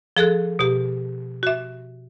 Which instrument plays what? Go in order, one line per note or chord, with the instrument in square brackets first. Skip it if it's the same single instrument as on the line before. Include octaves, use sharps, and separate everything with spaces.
[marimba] F3 G#4 A4 F#6
B2 G4
F#4 E5